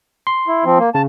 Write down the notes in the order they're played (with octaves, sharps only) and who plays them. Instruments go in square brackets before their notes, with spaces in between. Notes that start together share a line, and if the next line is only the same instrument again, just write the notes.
[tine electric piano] C6
[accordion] E4
F3 C4
A#3
[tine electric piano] C#3 [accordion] A5